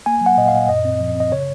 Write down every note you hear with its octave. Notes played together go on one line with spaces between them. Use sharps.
A#3 G#5
F#3
F#5
A#2 D#5
F5
A#2
F#2 D#5
C4
F3
C4 D#5
C#3 C#5